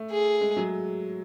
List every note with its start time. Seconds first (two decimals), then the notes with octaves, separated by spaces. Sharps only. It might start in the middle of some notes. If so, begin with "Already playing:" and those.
Already playing: A3
0.11 G#4
0.41 G#3
0.57 F#3